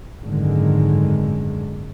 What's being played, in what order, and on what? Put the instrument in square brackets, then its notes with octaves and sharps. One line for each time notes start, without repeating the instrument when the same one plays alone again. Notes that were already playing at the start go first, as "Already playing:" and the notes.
[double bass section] G#1 F#2 A2 D3 D#3 G#3